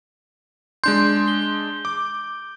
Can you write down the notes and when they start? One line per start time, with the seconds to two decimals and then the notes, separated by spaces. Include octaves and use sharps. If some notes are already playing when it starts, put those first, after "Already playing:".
0.84 G#3 D4 C6 G6
1.28 G7
1.85 D6